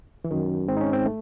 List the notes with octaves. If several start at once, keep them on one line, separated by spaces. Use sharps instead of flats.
E3
F#2 D#3
G#2 C4
D#4
C#4
C4
A3